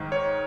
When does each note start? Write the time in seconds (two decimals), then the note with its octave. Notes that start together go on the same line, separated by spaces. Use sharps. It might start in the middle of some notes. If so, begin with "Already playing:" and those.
Already playing: G#2 D#3
0.12 C#5